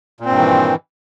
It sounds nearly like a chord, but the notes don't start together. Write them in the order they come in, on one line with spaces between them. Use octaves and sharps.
A#2 C4 G2 D#3 E3